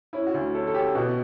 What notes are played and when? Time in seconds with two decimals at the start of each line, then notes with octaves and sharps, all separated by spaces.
0.13 C#4 E4
0.27 F#4
0.34 D2
0.54 C#4 A4
0.67 A4
0.74 C#4 G4
0.95 B2 F#4